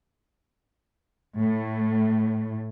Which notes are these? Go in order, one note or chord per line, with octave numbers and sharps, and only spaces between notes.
A2